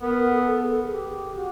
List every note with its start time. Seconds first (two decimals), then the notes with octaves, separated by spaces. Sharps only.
0.01 B3 A#4
0.31 A4
0.62 G#4
0.91 G4
1.35 F#4